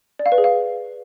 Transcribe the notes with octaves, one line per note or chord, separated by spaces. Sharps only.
D5
F5
B4
G#4
F5